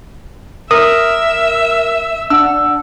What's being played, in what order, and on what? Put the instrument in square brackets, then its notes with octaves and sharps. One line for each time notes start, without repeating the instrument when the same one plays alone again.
[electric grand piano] A#4 [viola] E5 [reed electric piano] D#6
[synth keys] D4 F#5 [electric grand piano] E6